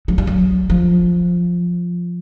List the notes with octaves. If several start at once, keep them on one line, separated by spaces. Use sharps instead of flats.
F#3
G3
F#3
F3